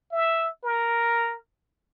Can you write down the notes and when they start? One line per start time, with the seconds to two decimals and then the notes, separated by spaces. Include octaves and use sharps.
0.12 E5
0.63 A#4